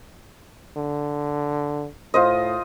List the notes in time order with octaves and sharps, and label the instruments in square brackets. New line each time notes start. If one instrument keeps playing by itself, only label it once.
[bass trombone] D3
[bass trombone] A2 [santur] F4 C5 D#5